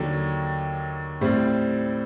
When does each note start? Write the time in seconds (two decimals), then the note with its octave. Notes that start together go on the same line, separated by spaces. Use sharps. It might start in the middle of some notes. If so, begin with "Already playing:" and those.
Already playing: D#2 D3 F#3
1.21 A2 G3 C4